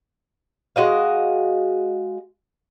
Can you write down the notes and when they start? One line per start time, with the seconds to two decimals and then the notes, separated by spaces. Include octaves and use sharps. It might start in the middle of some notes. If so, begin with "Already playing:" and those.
0.76 G#3 F#4 D#5 F5